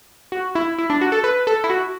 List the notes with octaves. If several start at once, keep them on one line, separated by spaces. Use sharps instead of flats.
F#4
E4
E4
D4
F#4
A4
B4
A4
E4
F#4